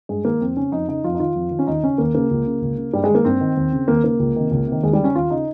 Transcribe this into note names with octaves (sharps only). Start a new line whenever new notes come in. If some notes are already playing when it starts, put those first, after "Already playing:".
G2 G#3
D#3 A#3
F2 C4
C#3 C#4
F2 D#4
C#3 D#4
F2 F4
D#4
D#3 F4
F2
D#3
C#4
D#2 D#4
C#3 C#4
D#2 A#3
C#3 A#3
C#2
C#3
C#2
C#3
G2 G3
G#3
D#3
A#3
G2 C4
D#3
D#2
C#3
D#2 A#3
C#3 A#3
C#2
C3 D#3
C#2
C3 D#3
D#2 G#3
G3
C#3 C#4
D#2 F4
C#3 D#4